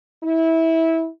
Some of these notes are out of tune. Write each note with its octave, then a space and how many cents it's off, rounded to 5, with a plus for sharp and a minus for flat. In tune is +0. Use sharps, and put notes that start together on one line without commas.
E4 -20